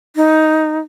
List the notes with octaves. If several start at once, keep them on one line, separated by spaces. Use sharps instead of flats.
D#4